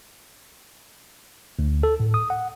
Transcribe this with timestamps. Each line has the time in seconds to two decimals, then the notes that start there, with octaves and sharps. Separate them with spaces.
1.59 D2
1.83 A4
2.00 A2
2.14 D#6
2.30 F#5